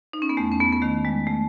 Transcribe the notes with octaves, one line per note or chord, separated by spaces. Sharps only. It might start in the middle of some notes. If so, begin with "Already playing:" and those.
D#4
C#4
B3
E2 A3
C#4
B3
B3
D#3 A3
G#3
A3